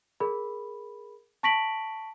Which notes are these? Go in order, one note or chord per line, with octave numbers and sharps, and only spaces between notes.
G#4 A#4 B5
A5 C#6 A#6 B6 D7 F#7